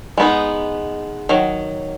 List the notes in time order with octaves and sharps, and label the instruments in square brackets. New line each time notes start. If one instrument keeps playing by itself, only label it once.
[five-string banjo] G#3 B3 D#4
D#3 F#3